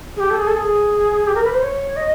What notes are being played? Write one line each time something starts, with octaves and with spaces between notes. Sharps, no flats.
G#4
G4
A4
G#4
A4
G#4
G4
A#4
B4
C5
C#5
D#5